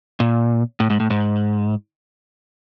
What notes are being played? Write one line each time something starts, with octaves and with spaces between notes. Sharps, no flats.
A#2
A2
G#2
A2
G#2